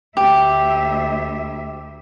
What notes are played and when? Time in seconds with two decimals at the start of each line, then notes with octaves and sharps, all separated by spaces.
0.17 D2 G4 E5